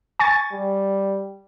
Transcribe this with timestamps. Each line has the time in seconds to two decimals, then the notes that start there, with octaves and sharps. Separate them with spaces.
0.20 G#5 C#6 A6
0.53 G3